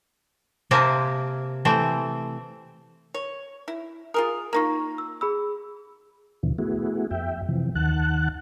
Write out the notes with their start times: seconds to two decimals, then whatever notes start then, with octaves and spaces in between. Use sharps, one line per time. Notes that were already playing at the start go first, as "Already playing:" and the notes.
0.71 C3 A#3 C4 E5 G#5 A5
1.65 E3 A3 C4
3.14 C#5
3.68 E4
4.14 F4 G#4 A#4 D#6
4.53 A#3 D#4 F4 A#5 C#6
4.98 E6
5.21 G#4 B5 E6
6.43 D#2 B2 D3 E3 F3
6.58 A3 B3 E4 F#4 G#4
7.11 F2 E5 G5
7.49 C3 E3 F3
7.75 D#2 D#3 F#5 A5 F#6